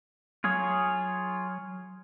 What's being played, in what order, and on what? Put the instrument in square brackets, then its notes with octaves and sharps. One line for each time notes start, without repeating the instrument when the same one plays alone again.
[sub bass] F#3 [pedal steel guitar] F4 G#4 C#5